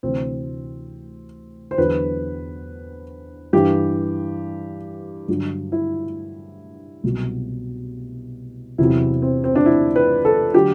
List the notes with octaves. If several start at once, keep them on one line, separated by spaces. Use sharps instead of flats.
D2 C3 E3 C4
C5
E2 D3 F#3 B4
G2 E3 G4
G2 D3 F#3
E4
C2 B2 F#3
E2 C3 F#3 E4
C4
C4
D4
E4
B4
A4
D3 F#3 G4